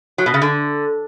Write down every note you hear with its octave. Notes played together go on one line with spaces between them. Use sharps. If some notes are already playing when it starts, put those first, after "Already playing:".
F#3
B2
C#3
D3